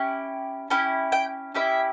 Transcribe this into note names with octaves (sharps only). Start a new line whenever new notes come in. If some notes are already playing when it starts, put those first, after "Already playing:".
Already playing: C#4 E4 G4
C#4 E4 G4 G5
G5
C#4 E4 G4 E5